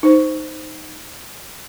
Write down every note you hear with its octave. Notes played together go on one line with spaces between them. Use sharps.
D#4 C5